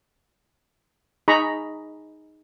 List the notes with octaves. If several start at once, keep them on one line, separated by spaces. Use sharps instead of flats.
D#4 G#4 D#5 A#5 B5 C#6